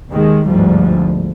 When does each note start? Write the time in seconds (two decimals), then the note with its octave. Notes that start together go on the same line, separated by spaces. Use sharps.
0.10 D#2 D#3 G#3
0.47 G1 D2 G#2 F3 G3